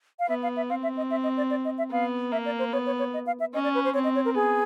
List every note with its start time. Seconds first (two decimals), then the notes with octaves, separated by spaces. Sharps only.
0.19 F5
0.29 B3 E5
0.43 F5
0.57 E5
0.70 C4 F5
0.83 E5
0.97 D#5
1.11 E5
1.24 D#5
1.37 D5
1.50 D5
1.65 D#5
1.78 E5
1.91 B3 F5
2.32 A#3 E5
2.45 D5
2.59 C5
2.73 B3 C#5
2.86 C#5
2.99 C#5
3.14 D#5
3.27 F5
3.40 E5
3.54 C#4 D#5
3.64 D5
3.75 B4
3.84 C5
3.94 C4 C#5
4.04 D#5
4.15 C#5
4.25 A#4
4.35 B3 G#4